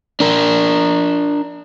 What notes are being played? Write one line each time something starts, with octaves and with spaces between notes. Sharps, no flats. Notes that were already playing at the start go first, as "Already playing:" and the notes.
D4 A#4